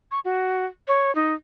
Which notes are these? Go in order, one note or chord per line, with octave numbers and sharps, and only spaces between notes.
C#6
F#4
C#5
D#4